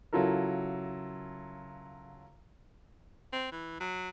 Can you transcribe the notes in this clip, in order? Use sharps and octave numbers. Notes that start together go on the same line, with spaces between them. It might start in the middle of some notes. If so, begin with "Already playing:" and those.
C#3 F#3 E4 F4 A4 A#4
C4
E3
F#3